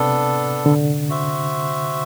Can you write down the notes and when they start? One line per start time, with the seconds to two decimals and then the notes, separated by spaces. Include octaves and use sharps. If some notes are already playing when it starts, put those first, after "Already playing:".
Already playing: C3 B3 D4 A4
0.66 D3
1.10 F#4 C5 E5